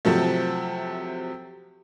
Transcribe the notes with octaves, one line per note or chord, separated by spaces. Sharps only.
C3 F3 F#3 A3